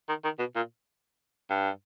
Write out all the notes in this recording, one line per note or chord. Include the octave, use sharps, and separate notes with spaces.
D#3
D#3
B2
A#2
G2